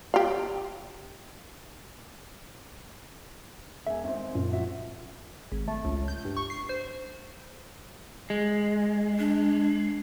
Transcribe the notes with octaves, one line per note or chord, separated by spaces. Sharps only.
G4 F5
E1 E5 G#5
G#1 C4
F#2 A#2
F3 F#4 E5
G#1
A3
C#2
G6
G2
C#6
C7
C5
G#3
D4